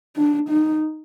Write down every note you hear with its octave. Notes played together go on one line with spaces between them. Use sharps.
D4
D#4